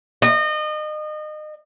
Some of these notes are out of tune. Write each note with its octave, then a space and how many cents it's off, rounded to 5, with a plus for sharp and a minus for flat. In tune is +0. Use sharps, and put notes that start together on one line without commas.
D#5 -30